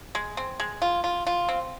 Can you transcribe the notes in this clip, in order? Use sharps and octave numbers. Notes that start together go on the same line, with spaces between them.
G#3
C4
G#3
F4
F4
F4
C4